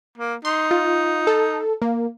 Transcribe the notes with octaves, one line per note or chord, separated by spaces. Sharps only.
A#3
D#4 C6
F4
A4
A#3